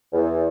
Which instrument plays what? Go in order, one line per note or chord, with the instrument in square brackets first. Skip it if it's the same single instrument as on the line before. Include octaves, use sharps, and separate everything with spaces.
[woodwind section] E2